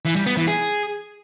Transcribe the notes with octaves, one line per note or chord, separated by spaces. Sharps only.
E3
G3
B3
E3
G#4